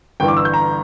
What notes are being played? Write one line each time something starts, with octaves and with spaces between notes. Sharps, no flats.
G1 G2 E3 G5
D6
E6
G6
A#5